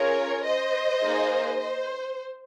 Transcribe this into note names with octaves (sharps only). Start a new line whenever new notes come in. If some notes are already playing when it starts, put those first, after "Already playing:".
Already playing: C#4 F4 G#4 A#4 C#5
C5 D#5
A#3 D#4 G#4
C5